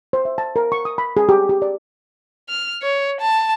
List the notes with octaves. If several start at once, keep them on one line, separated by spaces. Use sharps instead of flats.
C5
E5
A5
A#4
C#6
D#6
B5
G#4
G4
G4
D5
F6
C#5
A5